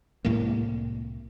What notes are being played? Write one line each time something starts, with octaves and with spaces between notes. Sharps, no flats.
C2 A2 G#3 A#3